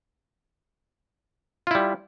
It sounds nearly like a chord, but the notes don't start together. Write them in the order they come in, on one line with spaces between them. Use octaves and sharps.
F4 E4 G3